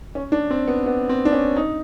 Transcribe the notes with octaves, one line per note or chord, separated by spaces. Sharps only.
C#4
D4
C4
B3
B3
C4
D4
C#4
D#4